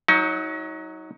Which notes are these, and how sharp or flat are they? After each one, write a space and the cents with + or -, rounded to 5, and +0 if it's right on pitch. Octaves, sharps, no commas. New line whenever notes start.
F#3 +0 D#4 +35